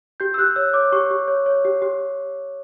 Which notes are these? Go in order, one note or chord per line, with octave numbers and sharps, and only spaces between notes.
G4 G6
E6
G4 F#6
C#5 E6
E6
C#5 D6
G4 C#6
G4
C#5
C#5
G4
G4